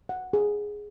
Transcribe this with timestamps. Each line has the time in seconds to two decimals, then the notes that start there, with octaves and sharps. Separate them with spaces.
0.09 F#5
0.33 G#4